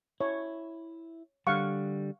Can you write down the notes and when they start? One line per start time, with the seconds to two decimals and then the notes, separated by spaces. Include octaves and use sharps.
0.21 E4 C#5
1.47 D3 G3 F5 F#5 C#6